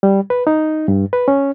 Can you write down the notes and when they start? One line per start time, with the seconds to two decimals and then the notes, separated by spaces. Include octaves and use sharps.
0.03 G3
0.30 B4
0.47 D#4
0.88 G2
1.13 B4
1.28 C#4